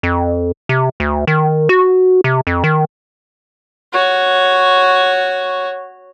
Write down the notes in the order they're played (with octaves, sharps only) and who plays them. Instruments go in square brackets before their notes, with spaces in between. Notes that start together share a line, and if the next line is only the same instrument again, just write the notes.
[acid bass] F2
C3
D2
D#3
F#4
C3
F2
D#3
[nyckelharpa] F#4 C#5